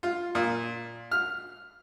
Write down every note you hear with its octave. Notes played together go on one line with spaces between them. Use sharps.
F4
A#2
F6